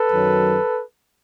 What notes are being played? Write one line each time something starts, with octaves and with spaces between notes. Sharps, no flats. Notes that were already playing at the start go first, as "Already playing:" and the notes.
Already playing: A4 B4
F#2 D#3 F#3